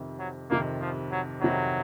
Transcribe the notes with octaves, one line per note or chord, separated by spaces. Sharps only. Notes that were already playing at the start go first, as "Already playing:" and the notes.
Already playing: F2 C3 D#3
F#3
F2 C3 D#3 A#3
F3
F#3
F2 C3 D#3 F#3